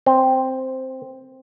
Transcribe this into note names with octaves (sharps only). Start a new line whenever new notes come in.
C4